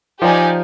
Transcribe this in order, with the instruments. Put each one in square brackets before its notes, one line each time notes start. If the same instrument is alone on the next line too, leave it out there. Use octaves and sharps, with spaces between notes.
[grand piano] F3 [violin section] D#4 G4 D5 G#5